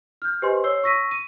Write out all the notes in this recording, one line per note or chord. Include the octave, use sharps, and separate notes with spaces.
F6 G6
G4 B4 C5 D#5 G#5 C6
C#5 E6 C7 G7
C#6 E6 A#6 B6 D#7
D#7